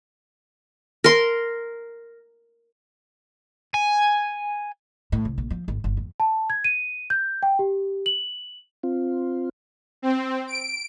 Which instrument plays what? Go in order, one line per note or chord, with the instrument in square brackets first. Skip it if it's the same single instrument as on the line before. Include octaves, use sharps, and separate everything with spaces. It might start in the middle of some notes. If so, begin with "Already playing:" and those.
[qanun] A#4 C6
[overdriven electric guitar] G#5
[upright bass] A2
C2
A#1
F3
G#1
G1
F2
[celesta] A5
G#6
D#7
G6
G5
G4
F#7
[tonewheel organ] C4 F4
[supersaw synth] C4
D7